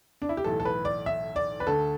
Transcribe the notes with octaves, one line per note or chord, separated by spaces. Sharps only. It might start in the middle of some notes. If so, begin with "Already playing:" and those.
D4
E4
G4
B1 A2 E3 A3 A4
A4
B4
D5
E5
D5
B4
D2 D3 A3 A4